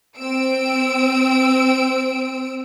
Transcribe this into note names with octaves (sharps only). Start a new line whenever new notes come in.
C4 E6 D7